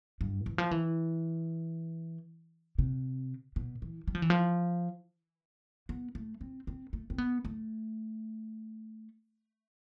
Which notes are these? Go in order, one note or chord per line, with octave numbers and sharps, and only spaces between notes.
G2
E3
F3
E3
C3
B2
E3
G3
F3
E3
F3
B3
A3
C4
C4
A3
C4
B3
A3